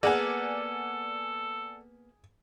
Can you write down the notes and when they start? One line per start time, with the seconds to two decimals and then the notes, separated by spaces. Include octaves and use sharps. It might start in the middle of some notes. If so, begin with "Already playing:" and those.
0.03 A#3 B3 G#4 A4 D5 F#5 G#5